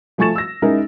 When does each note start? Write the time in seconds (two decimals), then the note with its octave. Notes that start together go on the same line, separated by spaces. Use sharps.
0.18 F3 A3 G#5 C#6 A6 E7
0.35 E6 A#6
0.62 G#3 C#4 D#4 E4 A#4